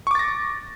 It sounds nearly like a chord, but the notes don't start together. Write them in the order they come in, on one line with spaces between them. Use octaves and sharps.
C#6 D6 A6 A#6